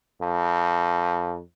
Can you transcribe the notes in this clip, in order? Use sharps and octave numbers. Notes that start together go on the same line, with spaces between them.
F2